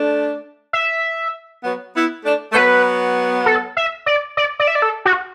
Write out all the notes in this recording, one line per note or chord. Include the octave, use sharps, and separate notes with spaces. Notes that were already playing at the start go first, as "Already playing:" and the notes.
Already playing: A3 D4
E5
F#3 B3
B3 E4
A3 D4
A3
F#3 B3 B4
A4
E5
D5
D5
D5
E5
D5
A4
F#4